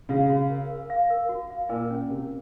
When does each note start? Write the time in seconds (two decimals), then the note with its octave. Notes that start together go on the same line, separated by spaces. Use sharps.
0.09 C#3 F5
0.30 F#4
0.50 A#4
0.70 A#4
0.90 F5
1.10 A#4
1.29 F#4
1.50 F5
1.69 A#2 A#4
1.90 C#4
2.10 C3 A#4